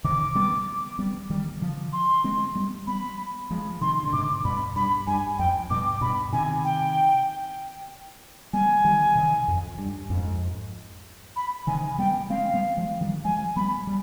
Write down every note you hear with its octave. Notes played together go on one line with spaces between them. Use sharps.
C3 D#3 D6
G3 B3
G3 B3
D#3 G3
D3 F3
C6
G#3 C4
G3 B3
G3 B3 B5
F3 G#3
C3 D#3 C6
D3
G#2 C3 D6
G2 B2 B5
G2 B5
G2 G#5
F2 G5
G2 B2 D6
G2 B2 B5
C3 D#3 G#5
G5
G3 B3 G#5
D#3 G3
C3 D#3
F2
G2
F2 G#2
B5
C3 D#3 G#5
G3 B3 G5
G#3 C4 F5
G3 B3
F3 G#3
D#3 G3
F3 G#3 G#5
G3 B3 B5
G3